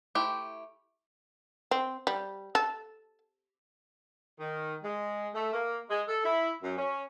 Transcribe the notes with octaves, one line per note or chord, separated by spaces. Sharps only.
A3 E4 G4 C5 G5
C4
G3
A4
D#3
G#3
A3
A#3
G#3
A4
E4
F#2
C#4